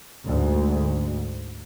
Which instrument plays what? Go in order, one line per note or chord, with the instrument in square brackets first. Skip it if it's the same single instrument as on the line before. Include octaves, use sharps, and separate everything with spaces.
[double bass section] D2 G#2